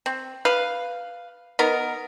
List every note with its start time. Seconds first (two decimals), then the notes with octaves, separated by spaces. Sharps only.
0.06 C4
0.45 B4 F5
1.59 B3 D#4 A#4